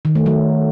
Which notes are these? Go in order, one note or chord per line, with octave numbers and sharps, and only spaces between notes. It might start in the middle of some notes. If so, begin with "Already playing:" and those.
D#3
A3
F#3